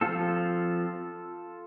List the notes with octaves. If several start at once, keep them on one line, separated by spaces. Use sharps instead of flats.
F3 C4 F4 A4